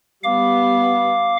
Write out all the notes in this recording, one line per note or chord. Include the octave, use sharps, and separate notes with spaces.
G3 B3 F5 D6